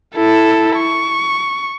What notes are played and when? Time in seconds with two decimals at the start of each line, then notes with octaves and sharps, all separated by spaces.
0.16 E4 A4
0.77 C#6